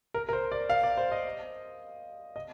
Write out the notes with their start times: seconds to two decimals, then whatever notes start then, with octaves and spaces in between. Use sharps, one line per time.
0.14 A#4
0.29 A#4
0.33 C5
0.52 D5
0.70 F5
0.83 D5
0.97 C5
1.12 D#5
2.36 D#5